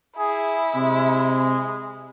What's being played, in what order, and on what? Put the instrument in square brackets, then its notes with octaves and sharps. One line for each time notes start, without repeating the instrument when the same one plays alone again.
[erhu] E4 [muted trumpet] G#4
[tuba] C3 [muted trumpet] G#3